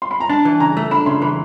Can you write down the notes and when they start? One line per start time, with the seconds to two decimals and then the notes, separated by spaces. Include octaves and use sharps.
0.02 C6
0.11 B5
0.20 A#5
0.30 D4 A5
0.45 E3
0.60 C#3 A#5
0.77 A3
0.91 D4 B5
1.06 C#3 C6
1.22 E3 B5